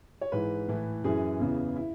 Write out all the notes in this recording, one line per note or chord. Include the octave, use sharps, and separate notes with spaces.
C#5
G#2 E3 B4
A2 E3
F#2 E3 G#4
E2 C#3 E3
E4